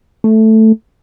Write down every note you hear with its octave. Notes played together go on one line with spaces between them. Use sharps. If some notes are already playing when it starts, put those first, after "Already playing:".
A3